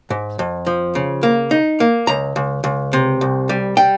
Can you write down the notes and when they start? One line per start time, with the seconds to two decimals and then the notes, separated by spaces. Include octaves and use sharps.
0.10 G#2
0.39 F2
0.67 F3
0.95 C#3
1.23 A#3
1.51 D#4
1.80 A#3
2.07 C#2 A#5
2.36 C#2
2.64 C#2
2.93 C3
3.21 C2
3.49 G3
3.77 G3 G5